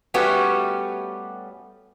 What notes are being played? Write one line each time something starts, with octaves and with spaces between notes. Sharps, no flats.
G3 A3 B3 C#4 F#4 G4